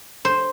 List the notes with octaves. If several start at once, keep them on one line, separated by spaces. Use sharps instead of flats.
C5